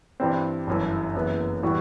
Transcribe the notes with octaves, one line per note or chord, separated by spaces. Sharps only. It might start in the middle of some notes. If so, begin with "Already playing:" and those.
G2 E3 G3 C4
G1 F#2 E3
F#1 F#2 E3 B3
A2 E3 G3 B3 F#4